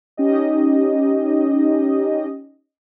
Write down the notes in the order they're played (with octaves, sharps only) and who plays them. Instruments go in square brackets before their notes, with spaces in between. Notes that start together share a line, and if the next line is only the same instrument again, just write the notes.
[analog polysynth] C#4 D#4 G4 D#5